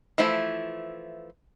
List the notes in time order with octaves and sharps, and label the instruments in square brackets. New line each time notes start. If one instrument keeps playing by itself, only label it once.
[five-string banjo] E3 F3 A3 E4